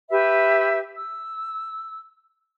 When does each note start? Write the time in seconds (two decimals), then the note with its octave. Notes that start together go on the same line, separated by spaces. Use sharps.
0.10 G4 B4 E5
0.97 E6